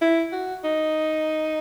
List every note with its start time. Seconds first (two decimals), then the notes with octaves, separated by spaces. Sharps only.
0.01 E4
0.32 F#4
0.64 D#4